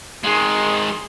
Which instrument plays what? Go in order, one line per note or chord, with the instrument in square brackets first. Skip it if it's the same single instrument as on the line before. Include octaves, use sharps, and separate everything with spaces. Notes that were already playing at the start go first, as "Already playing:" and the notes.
[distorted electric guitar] D#3 G#3 [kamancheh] G#4 C6